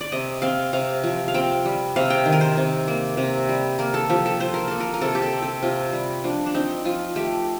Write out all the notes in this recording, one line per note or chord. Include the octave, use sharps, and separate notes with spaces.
D5
C3 D#5
C4 F5
C3 F5
F3
F5
C4 G5
G3
C3 F5
G5
D#3
A#4
C5
C3
A#3
C3
G3
A#3 A#4
A4
F3 G4
A4
F3 C5
A#4
A#3 A4
A#4
A#4
C3 A4
G4
A4
C4
G4
C3 F4
G3
F3 D4
D4
C4 D#4
F3 F4
A3 G4